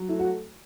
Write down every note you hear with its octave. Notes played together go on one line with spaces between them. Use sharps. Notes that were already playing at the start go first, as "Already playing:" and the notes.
Already playing: F#3
A3 E4
F#4